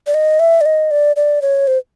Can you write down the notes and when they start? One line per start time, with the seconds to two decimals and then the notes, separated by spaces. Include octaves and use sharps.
0.07 D5
0.14 D#5
0.40 E5
0.61 D5
0.66 D#5
0.91 D5
1.16 D5
1.42 C#5
1.67 C5